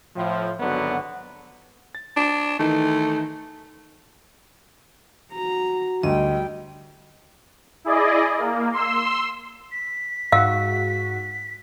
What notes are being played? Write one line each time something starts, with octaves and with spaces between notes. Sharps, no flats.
A2 F3
G#1 D3 F#3 B3 F#4
A6
D4
D#3 E3 A3 D#4
F#4 A#5
D2 G3 D#5 G5
E4 G#4 D5 D#5
A#3
C6 E6
B6
G#2 F#4 F5 E6